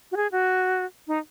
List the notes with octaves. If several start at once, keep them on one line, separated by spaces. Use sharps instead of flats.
F#4
G#4
F#4
D#4